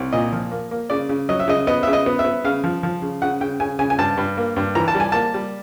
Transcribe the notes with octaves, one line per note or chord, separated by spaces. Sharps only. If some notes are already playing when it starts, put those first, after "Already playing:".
Already playing: C2
A#2 D#5
F3
A#3
A#3
C#3 D5
C#3
F#3 D#5
E5
C#3 D#5
B3 D#5
C#3 E5
D#5
B3
E5
B3
C#3 F5
F3
F3
C#3
C#3 F#5
C#3 G5
C#3 G#5
C#3 G#5
G#5
G2 A5
G2
A#3
G2
E3 A#5
A5
G3
G#5
A#3 A5
G3